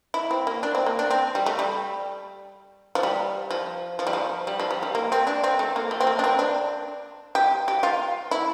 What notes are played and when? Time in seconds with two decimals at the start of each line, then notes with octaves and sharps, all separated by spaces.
0.14 E4
0.31 C4
0.47 A#3
0.63 D4
0.75 C4
0.86 A#3
0.99 D4
1.10 C4
1.35 G3
1.46 A3
1.59 G3
2.95 F3
3.03 G3
3.51 F3
3.99 F3
4.07 G3
4.13 F3
4.47 G3
4.60 F3
4.71 G3
4.83 G3
4.95 A#3
5.12 C4
5.27 D4
5.43 C4
5.59 A3
5.76 A#3
5.91 A3
6.00 C4
6.07 A#3
6.19 D4
6.24 C4
6.39 D4
7.35 G4
7.68 G4
7.83 F4
8.31 E4